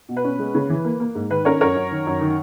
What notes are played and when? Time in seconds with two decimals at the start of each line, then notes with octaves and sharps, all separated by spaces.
0.09 B2
0.17 B4
0.24 C#4
0.39 G#3
0.55 C#3
0.70 E3
0.85 A#3
1.00 A#3
1.15 G#2
1.30 D#3 B4
1.45 C#4 A#4 C#5
1.61 F#2 A#4 C#5
1.76 F#2
1.91 D#3
2.06 F#2
2.21 D#3